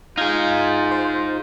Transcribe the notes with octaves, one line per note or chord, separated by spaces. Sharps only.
D#4 F4 G#4 F5 G6 G#6
C5